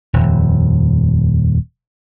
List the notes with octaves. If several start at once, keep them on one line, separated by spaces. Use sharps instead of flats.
D#1 F2